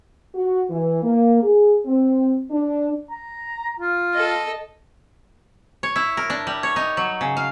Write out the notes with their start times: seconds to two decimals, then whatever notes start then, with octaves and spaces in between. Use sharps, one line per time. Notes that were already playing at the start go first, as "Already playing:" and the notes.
0.35 F#4
0.69 E3
1.03 A#3
1.43 G#4
1.86 C4
2.50 D4
3.11 A#5
3.79 F4
4.14 A4 D#5
5.83 C#5
5.96 E4
6.17 A#4
6.30 D4
6.47 G3
6.63 C#5
6.76 D#4
6.97 F#3
7.21 C#3
7.37 F5